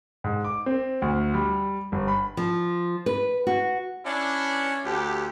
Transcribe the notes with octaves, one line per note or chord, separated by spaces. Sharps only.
G#2
D6
C4
D2
G3
G1
B5
F3
B4
F#4
C#4 D4 E4
D2 G4